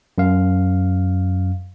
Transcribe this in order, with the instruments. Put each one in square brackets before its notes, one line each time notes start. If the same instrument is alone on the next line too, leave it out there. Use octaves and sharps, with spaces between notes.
[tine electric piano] F#2 F5